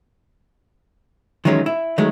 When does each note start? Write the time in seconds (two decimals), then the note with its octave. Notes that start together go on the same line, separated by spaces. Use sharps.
1.45 D#3 E3 F#3 G#3 C#4 F4
1.66 E4
1.98 D#3 F#3 G#3 A3